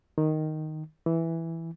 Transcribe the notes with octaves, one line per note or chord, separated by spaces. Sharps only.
D#3
E3